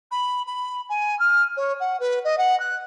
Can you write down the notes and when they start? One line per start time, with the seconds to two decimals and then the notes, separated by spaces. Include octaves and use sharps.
0.11 B5
0.46 B5
0.89 G#5
1.19 F6
1.57 C#5
1.80 F#5
2.00 B4
2.24 D#5
2.38 F#5
2.59 F#6